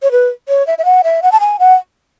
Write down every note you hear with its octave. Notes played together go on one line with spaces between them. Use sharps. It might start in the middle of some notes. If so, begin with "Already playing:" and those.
C#5
B4
C#5
E5
E5
F#5
E5
F#5
A5
G#5
F#5